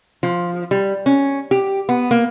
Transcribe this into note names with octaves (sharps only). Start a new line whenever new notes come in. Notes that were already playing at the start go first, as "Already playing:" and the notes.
F3
G3
C#4
G4
B3
A#3